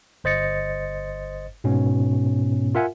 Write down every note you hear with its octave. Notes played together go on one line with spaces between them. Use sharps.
G1 C5 D#5 A6 C#7
G#2 B2 B3 C#4
F4 A#4 E5 F#5 G#5